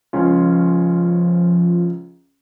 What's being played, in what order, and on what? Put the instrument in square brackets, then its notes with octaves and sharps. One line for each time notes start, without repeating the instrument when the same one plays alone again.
[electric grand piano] C#2 C#4 F4 [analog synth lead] F3